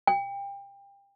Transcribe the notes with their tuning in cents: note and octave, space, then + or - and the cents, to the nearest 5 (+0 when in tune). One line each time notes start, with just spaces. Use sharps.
G5 +25